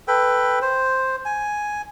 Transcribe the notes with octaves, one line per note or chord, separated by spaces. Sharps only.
A4 B4 G5
C5
G#5